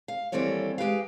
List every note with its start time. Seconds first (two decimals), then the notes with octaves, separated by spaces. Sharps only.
0.08 F5
0.32 D#2 E3 G3 C4 A4 C#5
0.78 G#3 G4 B4 F5